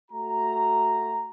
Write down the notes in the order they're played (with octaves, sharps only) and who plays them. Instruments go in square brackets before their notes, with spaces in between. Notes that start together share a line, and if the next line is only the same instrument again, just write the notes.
[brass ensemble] A3 F#4 A#5